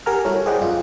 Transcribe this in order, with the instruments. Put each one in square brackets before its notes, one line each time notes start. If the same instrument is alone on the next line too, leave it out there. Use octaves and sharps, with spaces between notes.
[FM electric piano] G4 A#4 F#5 G#5 A#5 F6
G3 E4 F#4 A4 C#5
G#4 C5 D5 D#5 F#5 G5
F#2 F4 D#5